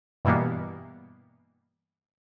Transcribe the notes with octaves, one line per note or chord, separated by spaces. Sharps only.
G2 B2 E3 G3 A#3 B3